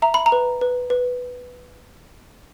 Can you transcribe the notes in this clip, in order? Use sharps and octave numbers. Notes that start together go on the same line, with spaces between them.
E5 A#5
B5
A#5
B4
B4
B4